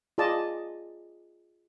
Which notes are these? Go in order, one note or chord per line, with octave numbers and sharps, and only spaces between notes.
F4 G#4 D5 D#5 A5